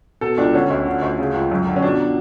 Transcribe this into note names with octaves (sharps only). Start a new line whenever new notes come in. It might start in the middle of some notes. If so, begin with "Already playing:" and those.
B2 A4
C#2 D4
D3 C#4
D2
D3
D2
C#3
C#2
F#2
D3
C#4
B2 D4